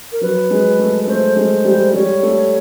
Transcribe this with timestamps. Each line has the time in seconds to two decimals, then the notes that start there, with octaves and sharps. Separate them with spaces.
0.12 A#4
0.21 F#3 B4
0.51 G#3
0.79 A3
1.07 A3 C5
1.36 G#3
1.65 G3
1.93 G3 C#5
2.23 A3